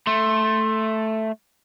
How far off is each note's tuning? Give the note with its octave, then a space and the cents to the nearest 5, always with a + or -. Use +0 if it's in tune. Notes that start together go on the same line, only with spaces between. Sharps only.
A3 +0 C6 +20